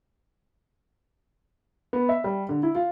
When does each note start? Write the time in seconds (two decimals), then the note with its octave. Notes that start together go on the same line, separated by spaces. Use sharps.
1.93 B3
2.09 E5
2.24 G3
2.49 D3
2.63 E4
2.75 F4